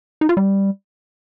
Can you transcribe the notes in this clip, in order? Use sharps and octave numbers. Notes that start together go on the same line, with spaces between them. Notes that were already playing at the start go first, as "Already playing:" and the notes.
D#4
F4
G3